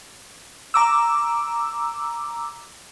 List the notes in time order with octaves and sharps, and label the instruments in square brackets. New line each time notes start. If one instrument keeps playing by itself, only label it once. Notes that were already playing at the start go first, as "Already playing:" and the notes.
[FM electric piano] A#5 D6 E6